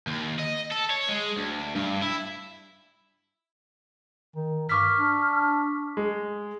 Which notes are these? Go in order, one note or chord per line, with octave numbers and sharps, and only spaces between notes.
D#2
D#5
A4
C#5
G#3
D2
G2
E4
D#3
G2 C#6 D6 F6 B6
D4
G#3